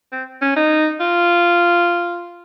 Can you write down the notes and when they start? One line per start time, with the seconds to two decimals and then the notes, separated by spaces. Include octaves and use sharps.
0.12 C4
0.42 C#4
0.56 D#4
1.00 F4